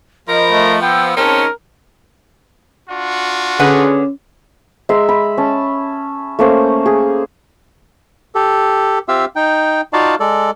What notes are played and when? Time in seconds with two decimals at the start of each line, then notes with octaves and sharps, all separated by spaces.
0.28 F3 A#4 D#5 B5
0.51 A3
0.81 B3 G5 E6
1.17 G#3 C4 C#4 D#4 A#4 A5
2.89 D4 F4 F#4
3.59 D3 C#4 G#4 B4 F#5
4.89 G#3 E5 A#5 C6
5.09 B5
5.37 C#4 A5
6.39 A3 A#3 C#4 C5
6.86 G#4
8.35 G4 A4
9.08 C4 F4 G4 E5 F5 E6
9.36 D#4 G5
9.93 D#4 F4 F#4 D5 F5 A5
10.20 G#3 A4 D5